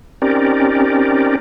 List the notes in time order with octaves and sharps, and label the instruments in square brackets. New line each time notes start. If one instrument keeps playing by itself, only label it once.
[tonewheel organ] C4 C#4 D#4 G4 A#4 D5